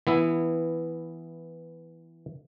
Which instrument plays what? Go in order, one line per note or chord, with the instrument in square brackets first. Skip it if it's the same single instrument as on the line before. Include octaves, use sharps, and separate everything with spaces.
[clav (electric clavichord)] E3 B3 E4